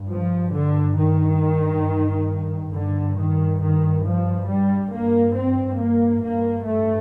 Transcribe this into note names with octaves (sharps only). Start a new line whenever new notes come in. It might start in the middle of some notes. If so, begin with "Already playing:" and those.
Already playing: G2
F3
D3
D#3
G2 D3
D#3
D#3
F3
G3
A#3
C4
A#3
G2 A#3
A3